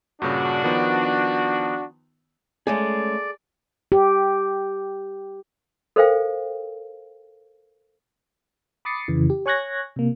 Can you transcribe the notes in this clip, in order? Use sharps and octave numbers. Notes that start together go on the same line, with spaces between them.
G2 A#2 C#3 D4 F#4
D#3 F3 B3
G#3 A3 C#4 G#4 A4 D5
G4
A4 A#4 C5 F5 G5
B5 D6 D#6 A6 C7 C#7
F2 C#3 E3
G4
C#5 G#5 C#6 F#6 G#6 A#6
C3 A#3